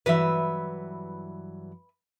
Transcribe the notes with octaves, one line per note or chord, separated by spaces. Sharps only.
G2 E3 F#3 B4 E5